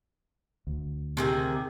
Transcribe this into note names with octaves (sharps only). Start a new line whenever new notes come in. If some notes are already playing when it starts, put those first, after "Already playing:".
D2
C3 D#3 G#4